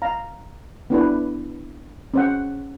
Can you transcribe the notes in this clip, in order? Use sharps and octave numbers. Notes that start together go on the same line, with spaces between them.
F5 A#5
B3 D4 E4 B4
C#4 C5 F#5